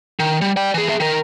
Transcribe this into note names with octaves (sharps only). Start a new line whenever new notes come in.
D#3
G3
D5 G5
E3 G#4
G#4 E5
D#3 A#4